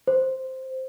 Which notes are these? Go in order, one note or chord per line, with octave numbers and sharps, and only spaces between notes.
C5